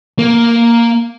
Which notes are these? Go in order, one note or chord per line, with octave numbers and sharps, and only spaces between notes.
A#3